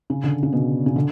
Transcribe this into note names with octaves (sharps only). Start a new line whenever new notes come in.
C#3
D3
C#3
B2
C#3
D3